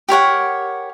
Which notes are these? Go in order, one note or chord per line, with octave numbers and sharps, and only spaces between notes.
G4 A#4 C#5 F#5